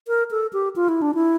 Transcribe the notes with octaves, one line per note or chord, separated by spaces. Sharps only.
A#4
A4
G4
F4
E4
D4
E4